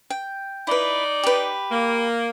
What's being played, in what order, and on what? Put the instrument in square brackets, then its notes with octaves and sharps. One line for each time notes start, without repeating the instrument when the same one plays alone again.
[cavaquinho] G5
[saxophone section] D#4 D5 [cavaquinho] E4 B4
[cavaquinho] G4 B4
[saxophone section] A#3